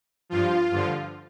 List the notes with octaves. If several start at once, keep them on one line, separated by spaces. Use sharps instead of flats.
G2 F3 F4
G2 D3 F3